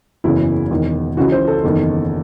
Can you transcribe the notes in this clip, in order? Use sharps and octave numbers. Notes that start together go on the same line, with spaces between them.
F#1 E2 C#3 E3 E4
E1 E2 D#3
C#2 C#3 E3 F#4
C5
A4
F#1 E2 D#3